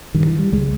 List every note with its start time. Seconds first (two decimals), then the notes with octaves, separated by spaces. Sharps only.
0.14 G2 D#3
0.26 E3
0.39 G3
0.52 C#2 G#3